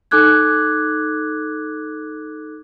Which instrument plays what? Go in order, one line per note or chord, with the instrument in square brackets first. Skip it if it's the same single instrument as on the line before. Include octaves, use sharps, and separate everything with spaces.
[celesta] D#4 A4 D6 F#6 G#6